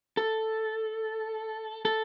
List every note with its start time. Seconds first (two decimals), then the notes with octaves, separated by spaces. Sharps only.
0.17 A4
1.85 A4